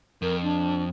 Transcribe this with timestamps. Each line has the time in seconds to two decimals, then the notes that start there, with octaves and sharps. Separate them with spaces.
0.22 F2 A#4
0.42 D4